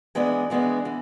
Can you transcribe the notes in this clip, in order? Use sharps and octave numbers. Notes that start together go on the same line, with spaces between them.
E3 G#3 B3 D4
E3 G#3 B3 D4
E3